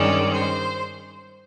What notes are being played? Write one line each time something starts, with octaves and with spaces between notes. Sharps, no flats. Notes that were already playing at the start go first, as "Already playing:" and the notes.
Already playing: G2 D#3 G#3 C#4 D5
C5